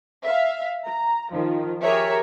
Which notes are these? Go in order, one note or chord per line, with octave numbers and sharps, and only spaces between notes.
E5 F5
A#5
D#3 F3
G4 G#4 A#4 C#5 E5